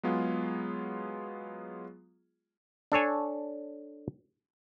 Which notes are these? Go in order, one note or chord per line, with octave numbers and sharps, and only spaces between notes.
F#3 G#3 B3 F4 G#4
D4 A4 C#5 G#5